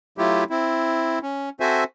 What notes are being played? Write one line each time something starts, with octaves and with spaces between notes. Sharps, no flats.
F#3 A3 E4 F4 G4
C4 E4
C#4
C4 F#4 A4 C5 E5 G#5